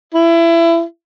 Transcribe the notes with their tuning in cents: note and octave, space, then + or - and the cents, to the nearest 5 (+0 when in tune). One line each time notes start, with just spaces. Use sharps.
E4 +25